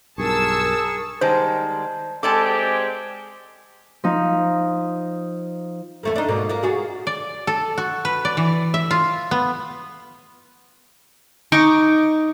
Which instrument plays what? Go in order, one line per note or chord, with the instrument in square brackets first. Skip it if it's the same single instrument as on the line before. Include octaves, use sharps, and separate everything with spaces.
[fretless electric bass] B1 G2 [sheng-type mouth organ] G#4 C#6 [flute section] A#4 [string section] A5 E6
[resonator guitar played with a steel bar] D#3 G3 G#3 [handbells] C5 D#5 A5
[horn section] G#3 C4 G4 [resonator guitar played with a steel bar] A4 D5 A5 [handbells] D6
[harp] F3 D#4
[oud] E2 A3 A#3
D4 D#4
G#2 B2 A#3
A#3 F4
F4 F#4 G#4
[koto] D5
A4
F#4
B4
D5
E3
E5
F4
B3
[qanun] D#4 C#6 D6